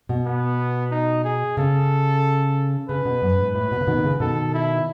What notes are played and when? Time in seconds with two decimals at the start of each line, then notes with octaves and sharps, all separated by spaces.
0.09 B2
0.26 B3
0.91 D#4
1.24 G#4
1.57 C#3 A4
2.88 C#3 B4
3.05 B2
3.22 F#2
3.39 G#2
3.55 A2 B4
3.71 B2
3.81 C#3
3.87 B2 D#3
3.97 B2
4.04 C#3
4.20 B2 D#3 A4
4.54 E4